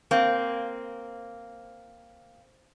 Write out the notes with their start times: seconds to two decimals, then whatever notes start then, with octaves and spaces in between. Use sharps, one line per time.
0.11 A#3 C4